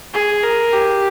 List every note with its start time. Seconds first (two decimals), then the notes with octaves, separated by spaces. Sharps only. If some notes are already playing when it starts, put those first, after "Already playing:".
0.13 G#4
0.43 A#4
0.73 G4